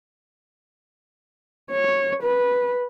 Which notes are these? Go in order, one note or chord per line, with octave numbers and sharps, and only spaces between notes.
C#5
B4